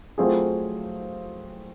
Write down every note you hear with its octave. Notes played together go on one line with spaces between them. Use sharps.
F#3 A3 C4 F4 G#4